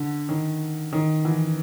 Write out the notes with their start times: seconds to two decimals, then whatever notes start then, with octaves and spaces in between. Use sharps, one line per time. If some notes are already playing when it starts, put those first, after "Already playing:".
Already playing: D3
0.29 D#3
0.93 D#3
1.25 E3